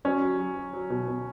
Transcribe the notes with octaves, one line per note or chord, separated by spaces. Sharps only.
F#3 C#4
F#3
F#3
F#3
F#3
B2
B2